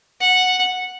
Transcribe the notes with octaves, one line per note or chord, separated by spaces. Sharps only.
F#5